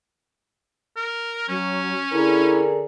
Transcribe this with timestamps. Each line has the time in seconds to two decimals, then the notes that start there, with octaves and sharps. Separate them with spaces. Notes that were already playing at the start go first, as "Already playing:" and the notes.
0.96 A#4
1.48 F#3 C#4
2.12 D3 E4 G#4 A#4